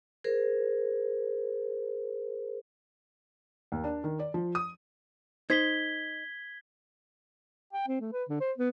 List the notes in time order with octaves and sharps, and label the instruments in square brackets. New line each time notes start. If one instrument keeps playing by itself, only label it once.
[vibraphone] G#4 A#4 C5
[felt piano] D#2
D4
D#3
D5
F3
D#6
[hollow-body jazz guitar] D#4 C5 [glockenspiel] G#6 B6 G7
[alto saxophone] G5
C4
A3
B4
D3
C5
B3